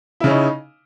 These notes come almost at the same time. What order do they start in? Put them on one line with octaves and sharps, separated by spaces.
E4 C#3 C#4 D#4